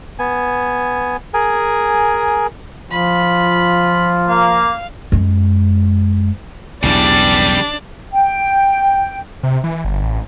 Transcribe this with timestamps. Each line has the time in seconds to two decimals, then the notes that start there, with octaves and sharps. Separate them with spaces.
0.19 B3 G#5
1.34 G#4 A#4 G#5
2.91 F3 F4 B5
4.28 A#3 F5
5.12 F#2 G#3
6.83 B1 E2 C#3 E3 G3 D4 A6
8.12 G5
9.43 C3
9.64 E3
9.85 G1
10.03 A1